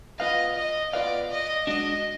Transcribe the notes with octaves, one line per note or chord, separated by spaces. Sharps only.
B3 F4 B4 D#5 F5
D#5
B3 F4 B4 D5 F5
D#5
G#3 D4 F#4 D#5